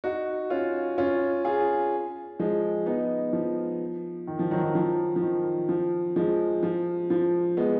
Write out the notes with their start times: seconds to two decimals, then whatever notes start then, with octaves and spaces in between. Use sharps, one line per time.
0.04 D#4 F#4
0.50 C#4 F4
0.98 C#4 F4
1.45 F4 G#4
2.39 F3 G#3
2.86 B3 D#4
3.33 F3
4.27 D#3
4.39 F3
4.51 D#3 F#3
4.63 D#3 F#3
4.75 F3
5.16 F3
5.22 D#3
5.69 F3
6.16 F3 G#3
6.63 F3
7.10 F3
7.57 G#3 B3